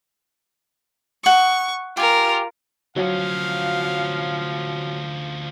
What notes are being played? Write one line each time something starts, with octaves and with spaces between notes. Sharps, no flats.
F#5 C#6 D#6
F4 G4 A#4 G#5
D2 F3 F#3 C#4 F5